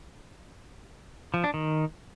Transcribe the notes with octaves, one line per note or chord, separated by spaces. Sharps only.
F3
D4
D#3